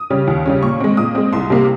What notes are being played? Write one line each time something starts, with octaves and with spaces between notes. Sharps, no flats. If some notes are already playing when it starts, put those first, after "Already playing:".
Already playing: D#6
C#3 G3 C#4
D#2
C#3 G3 C#4
A#2 C#6
G#3 C4
A#2 D#6
G#3 C4
C2 C6
C3 G3 A#3